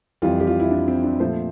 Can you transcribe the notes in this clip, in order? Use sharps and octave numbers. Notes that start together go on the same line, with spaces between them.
F2 E3 G3 F4
G4
F4
E4
D4
C4
D4
A#2 F3 A3 C5